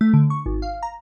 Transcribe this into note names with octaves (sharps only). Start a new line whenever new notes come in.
A3
D3
C#6
G#1
F5
A#5